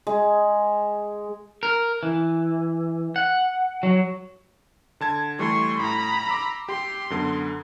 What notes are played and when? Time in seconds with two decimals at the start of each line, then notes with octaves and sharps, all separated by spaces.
0.07 G#3
1.63 A#4
2.03 E3
3.16 F#5
3.83 F#3
5.00 D3 A5 G#6
5.39 E3 G3 A3 C6 C#6
5.79 A2 A#5 B5
6.29 C6 D6 E6
6.69 G4 C6
7.10 F#2 D3 B3